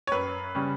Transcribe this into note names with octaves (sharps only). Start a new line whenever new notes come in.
C#5
F#2 B4
C#3 G3 C#4